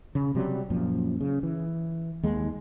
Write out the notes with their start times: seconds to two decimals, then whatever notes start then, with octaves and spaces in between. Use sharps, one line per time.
0.15 C#3
0.35 C3 F#3 G3
0.70 F#2 A#2 F3
1.21 C#3
1.43 E3
2.23 D#2 G#3